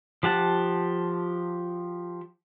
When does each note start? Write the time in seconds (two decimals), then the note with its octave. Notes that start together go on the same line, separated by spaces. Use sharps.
0.23 F3 G4 F#5 A5